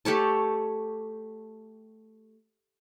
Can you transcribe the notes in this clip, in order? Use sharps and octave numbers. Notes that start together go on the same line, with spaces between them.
A3 G4 C#5 A5